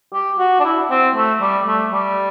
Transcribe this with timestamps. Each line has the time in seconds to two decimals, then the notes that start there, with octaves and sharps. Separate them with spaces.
0.13 G4
0.39 F#4
0.60 D4
0.65 E4
0.90 C4
1.15 A3
1.41 G3
1.67 A3
1.92 G3